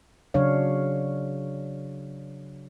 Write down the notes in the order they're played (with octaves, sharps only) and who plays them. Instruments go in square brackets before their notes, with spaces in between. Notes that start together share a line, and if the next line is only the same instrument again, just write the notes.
[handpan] C#3 F#3 D4 C#5 F5